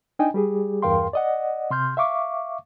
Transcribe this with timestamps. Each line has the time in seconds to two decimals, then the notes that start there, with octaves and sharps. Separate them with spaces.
0.19 D4 D#4 D#5 G5 G#5
0.34 G3 G4 G#4
0.82 E2 G2 A#4 F5 G5 C6
1.13 D5 D#5 F#5
1.71 C3 C6 F6 G6
1.97 E5 F5 C#6 D6